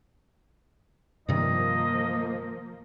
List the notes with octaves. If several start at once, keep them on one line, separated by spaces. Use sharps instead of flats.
G2 C3 D#3 F3 A#3 D#5